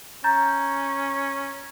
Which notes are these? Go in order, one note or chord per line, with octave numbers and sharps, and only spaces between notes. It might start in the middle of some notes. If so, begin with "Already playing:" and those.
C#4 A#5 G6 A6